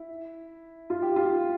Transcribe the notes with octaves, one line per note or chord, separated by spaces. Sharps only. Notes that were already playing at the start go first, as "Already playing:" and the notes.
Already playing: E4
F4
G4
F4